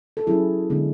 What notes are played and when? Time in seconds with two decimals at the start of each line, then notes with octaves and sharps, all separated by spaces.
0.17 A4
0.27 F#3 C#4 E4 G#4
0.70 D3 G#3 B3 D4